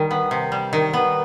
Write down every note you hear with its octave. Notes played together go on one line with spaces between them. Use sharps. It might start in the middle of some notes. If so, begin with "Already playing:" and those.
Already playing: D#3 G3
B3
C3
G3
D#3
B3